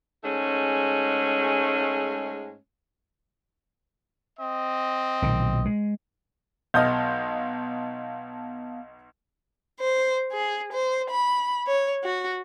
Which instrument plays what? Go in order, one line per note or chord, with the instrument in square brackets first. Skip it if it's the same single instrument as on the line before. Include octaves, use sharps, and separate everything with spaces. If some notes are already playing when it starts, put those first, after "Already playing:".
[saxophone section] G#2 G#3 A3 C#4
[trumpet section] C4 D#5
[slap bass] B1 A#2 D#3
G#3
[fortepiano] B1 D#6 F6 [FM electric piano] B3 F5 A5 [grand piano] D#5 G6
[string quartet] C5
G#4
C5
B5
C#5
F#4